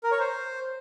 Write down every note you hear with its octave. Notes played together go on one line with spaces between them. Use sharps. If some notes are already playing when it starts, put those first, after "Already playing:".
A#4
C#5
C5